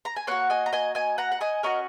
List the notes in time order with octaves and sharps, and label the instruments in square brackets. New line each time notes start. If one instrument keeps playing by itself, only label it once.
[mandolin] A#5
G#5
A#3 F#4 C#5 F#5
D#5 G#5
A#5
D#5 G#5
D#5 G#5
F#5 A#5
F#5
D#5 G#5
C#4 F#4 A#4 D#5